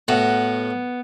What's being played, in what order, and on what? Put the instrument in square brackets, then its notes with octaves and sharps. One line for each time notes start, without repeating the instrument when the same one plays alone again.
[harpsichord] A2 [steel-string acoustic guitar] B3 [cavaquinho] F#4 F#5